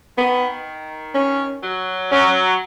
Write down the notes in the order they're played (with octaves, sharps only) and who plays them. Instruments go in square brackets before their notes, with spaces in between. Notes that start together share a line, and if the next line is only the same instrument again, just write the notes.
[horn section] D#3 [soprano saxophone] B3
[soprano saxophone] C#4
[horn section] F#3
[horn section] F#3 [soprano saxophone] C#4